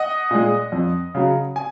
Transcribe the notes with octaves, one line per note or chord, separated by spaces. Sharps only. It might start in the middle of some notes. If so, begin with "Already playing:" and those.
Already playing: D#5 F#5
A#2 G#3
F2
C#3 F#3
G#5